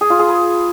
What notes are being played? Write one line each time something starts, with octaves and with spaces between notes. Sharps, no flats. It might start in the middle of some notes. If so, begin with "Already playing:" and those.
G#4
F4
G#4
B4